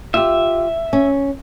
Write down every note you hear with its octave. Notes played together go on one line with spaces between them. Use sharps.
F4 G4 E5
C#4